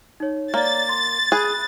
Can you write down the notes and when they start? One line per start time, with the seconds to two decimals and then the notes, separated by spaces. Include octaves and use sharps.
0.20 D#4 C#5
0.54 A#3 C#5 D5 A6
0.89 C6
1.32 G#4 B5 F#6